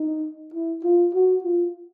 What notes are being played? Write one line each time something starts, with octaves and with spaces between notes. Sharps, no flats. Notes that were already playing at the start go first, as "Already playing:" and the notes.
Already playing: D#4
E4
F4
F#4
F4